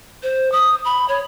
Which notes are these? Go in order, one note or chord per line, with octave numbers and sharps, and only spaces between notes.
C5
D#6
B5
C#5